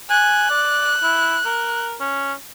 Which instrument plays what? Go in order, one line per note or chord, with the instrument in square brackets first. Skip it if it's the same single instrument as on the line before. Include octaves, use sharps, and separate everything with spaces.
[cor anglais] G#5 [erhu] F#6
[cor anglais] D5
E4
A#4
C#4